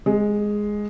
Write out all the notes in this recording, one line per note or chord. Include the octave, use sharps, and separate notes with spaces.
G#3